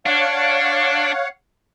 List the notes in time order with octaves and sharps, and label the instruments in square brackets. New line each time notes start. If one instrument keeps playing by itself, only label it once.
[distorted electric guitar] D4 [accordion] C#5 F5 F#5